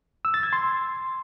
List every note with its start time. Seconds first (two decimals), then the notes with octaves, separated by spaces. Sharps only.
0.25 E6
0.34 A6
0.43 G#6
0.53 C6